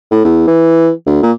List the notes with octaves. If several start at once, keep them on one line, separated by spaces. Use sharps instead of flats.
A2
E2
E3
D2
A#2